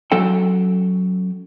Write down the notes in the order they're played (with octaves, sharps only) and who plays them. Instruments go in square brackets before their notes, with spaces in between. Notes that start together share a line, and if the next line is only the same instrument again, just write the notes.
[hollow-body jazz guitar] F#3 C#4 A4 G5